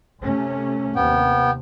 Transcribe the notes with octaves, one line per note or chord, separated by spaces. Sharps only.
C3 A3 C#4
D#2 C3 B3 G5